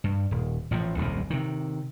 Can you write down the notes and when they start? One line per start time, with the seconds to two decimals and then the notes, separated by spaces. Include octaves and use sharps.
0.04 G2
0.31 D#1
0.71 A1 A2 F3
0.97 D#1 C2 F#2 C3
1.30 C3 D#3